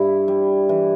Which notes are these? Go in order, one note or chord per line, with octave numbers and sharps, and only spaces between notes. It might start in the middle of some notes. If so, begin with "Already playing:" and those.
Already playing: G2 E4
G3
E3